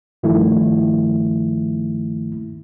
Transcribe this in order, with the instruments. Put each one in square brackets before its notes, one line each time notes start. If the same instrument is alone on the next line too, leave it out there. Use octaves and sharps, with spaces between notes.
[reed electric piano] G2 D#3 F3 A3 E4